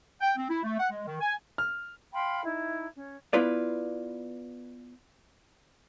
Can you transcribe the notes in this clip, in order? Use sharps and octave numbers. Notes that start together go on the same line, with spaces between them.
G5
C4
E4
A3
F#5
G#3
D#3
G#5
F6
F5 G5 B5 C6
D#4 E4
C#4
B3 E4 F4 B4 D5